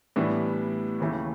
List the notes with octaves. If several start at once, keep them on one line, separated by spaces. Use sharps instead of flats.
A2 E3 G3 B3 D4
D#2 C#3 E3 A3 C#4